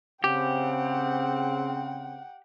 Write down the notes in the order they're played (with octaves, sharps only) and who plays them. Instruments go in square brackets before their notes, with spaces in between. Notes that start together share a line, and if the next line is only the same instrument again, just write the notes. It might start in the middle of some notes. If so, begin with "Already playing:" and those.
[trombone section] C#3 C4 [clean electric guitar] G4 [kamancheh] F#5 G5